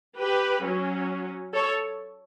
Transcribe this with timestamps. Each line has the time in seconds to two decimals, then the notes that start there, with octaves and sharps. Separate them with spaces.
0.19 G4 B4
0.64 F#3 C#4
1.54 A4 C#5